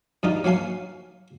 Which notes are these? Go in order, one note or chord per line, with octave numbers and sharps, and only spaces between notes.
G2 G3 D#4 F4
F#3 A#3 F5 G#5 C6